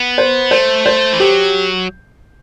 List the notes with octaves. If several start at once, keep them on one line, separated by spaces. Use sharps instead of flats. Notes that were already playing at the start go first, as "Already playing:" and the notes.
Already playing: B3
C5
A3 C5
C5
E3
F#3 G4